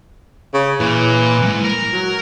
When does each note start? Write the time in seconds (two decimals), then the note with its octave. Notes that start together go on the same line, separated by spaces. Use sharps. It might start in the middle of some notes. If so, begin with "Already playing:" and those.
0.54 C#3
0.80 A#2 E3
1.42 F2 G#2
1.64 A#4
1.93 F#3